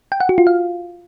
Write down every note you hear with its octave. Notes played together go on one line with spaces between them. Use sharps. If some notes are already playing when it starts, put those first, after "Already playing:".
G5
F#5
F#4
F4
F5